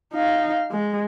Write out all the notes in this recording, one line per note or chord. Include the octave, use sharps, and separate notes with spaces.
D#4 F5
G#3